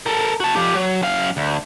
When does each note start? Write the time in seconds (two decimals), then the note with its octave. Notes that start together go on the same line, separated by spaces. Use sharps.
0.06 A4 A#4
0.40 F#4 A5
0.56 F3 G4
0.75 F#3
1.02 F#2 F5
1.37 D2